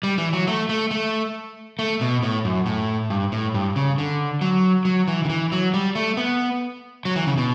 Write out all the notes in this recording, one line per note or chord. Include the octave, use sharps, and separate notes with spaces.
G3
E3
F#3
A3
A3
A3
A3
B2
A2
F#2
A2
G2
A2
G2
C#3
D3
F#3
F#3
E3
D3
E3
F#3
G3
A3
B3
F#3
E3
C#3
B2